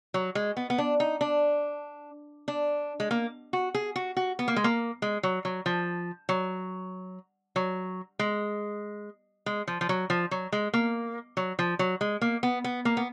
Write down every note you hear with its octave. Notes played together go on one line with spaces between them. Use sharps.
F#3
G#3
B3
B3
D4
D#4
D4
D4
G#3
A#3
F#4
G#4
F#4
F#4
B3
A#3
G#3
A#3
G#3
F#3
F#3
F3
F#3
F#3
G#3
G#3
F3
F3
F#3
F3
F#3
G#3
A#3
F#3
F3
F#3
G#3
A#3
B3
B3
A#3
B3